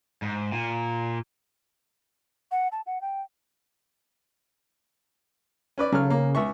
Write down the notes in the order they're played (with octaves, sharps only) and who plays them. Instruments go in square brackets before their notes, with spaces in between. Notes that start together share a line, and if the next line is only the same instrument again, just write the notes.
[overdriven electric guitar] G#2
A#2
[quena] F#5
A5
F#5
G5
[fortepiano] C#4 B4 D5
[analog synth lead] C#3 [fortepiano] F#3 A4 F6
[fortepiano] A#3
C#2 E5 C#6